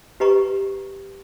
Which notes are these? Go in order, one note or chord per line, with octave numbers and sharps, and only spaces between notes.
G4 B4 D#5 A#5 C#6